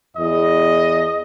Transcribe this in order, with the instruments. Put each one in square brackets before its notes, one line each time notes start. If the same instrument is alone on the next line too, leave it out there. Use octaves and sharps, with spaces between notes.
[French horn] E2 [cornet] D#5